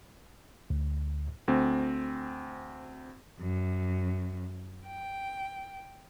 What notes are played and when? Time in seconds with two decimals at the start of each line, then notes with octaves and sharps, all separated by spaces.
0.70 D2
1.48 D2 C4
3.41 F#2
4.87 G5